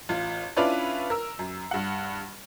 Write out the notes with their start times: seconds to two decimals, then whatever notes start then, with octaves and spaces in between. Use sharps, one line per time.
0.09 A1 F4
0.56 C#4 D4 E4 F4 B4 D5
1.10 A#4 E6
1.39 F#2
1.71 G2 F#5